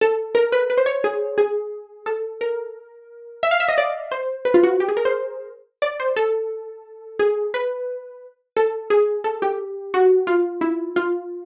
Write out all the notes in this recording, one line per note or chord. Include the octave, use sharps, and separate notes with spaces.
A4
A#4
B4
B4
C5
C#5
G#4
G#4
A4
A#4
E5
F5
E5
D#5
D5
C5
B4
F4
F#4
G4
G#4
A#4
C5
D5
C5
A4
G#4
B4
A4
G#4
A4
G4
F#4
F4
E4
F4